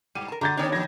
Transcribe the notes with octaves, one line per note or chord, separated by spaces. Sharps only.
G2 G3 D#7
A#4 A5
D3 F#4 A#5 G6 A6
D#3 B3 C4 D4 G4 C#5
E3 D#4 G#6 A#6